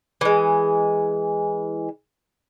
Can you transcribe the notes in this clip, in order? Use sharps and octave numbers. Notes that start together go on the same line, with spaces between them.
E3 G#3